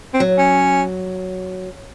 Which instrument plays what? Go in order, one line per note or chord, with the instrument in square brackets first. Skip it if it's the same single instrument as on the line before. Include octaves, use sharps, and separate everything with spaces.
[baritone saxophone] C4
[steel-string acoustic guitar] F#3
[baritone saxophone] C#4